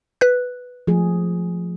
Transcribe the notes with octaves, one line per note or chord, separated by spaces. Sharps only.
B4 F#6
F3 A3 G#4